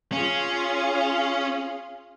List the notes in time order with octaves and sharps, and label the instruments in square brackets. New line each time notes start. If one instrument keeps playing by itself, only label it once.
[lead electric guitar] C#4 [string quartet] F4 G#4 F5